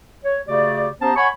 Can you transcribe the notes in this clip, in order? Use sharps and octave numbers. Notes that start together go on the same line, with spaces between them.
C#5
C#3 A3 F#4 G4 D5
B3 C#4 G4 C5 A5 A#5
C#5 F#5 G#5 B5 C#6